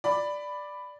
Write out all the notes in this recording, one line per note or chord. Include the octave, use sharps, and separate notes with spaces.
D5 B5